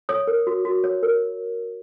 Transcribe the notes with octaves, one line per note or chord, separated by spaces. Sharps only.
C#5 D#6
A#4
F#4
F#4
C#5
A#4